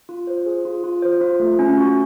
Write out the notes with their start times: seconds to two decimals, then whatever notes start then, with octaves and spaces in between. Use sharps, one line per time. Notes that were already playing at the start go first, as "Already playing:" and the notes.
0.09 F4
0.27 C5
0.46 G#4
0.65 F4
0.84 F4
1.02 C5
1.21 F4
1.40 A3
1.59 C#4
1.78 F#4